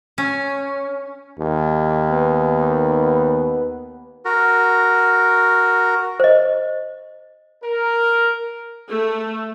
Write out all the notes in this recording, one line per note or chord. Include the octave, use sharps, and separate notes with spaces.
C#4
D#2
B3
F#4 A#4
C5 D#5
A#4
A3